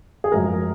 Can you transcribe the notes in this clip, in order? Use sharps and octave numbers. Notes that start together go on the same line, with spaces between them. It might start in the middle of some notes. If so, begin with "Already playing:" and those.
G#4
F#2 F3 G#3 A#4